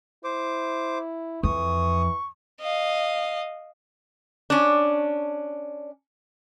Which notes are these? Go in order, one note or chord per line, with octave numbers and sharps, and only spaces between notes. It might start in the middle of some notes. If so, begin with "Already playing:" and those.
E4 C5 D6
F2 E3 C#6 D#6
D#5 F5
C#4 D4